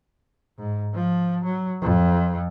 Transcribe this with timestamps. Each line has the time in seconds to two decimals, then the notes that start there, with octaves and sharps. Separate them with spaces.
0.58 G#2
0.94 F3
1.45 F#3
1.82 F2